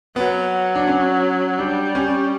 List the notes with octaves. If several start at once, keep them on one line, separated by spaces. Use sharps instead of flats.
F#3 B3
D4
C#4
G3 D4
C#4